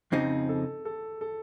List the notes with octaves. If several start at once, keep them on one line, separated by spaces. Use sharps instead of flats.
F2 C#3 F3 C4 D#4
A4
A4
A4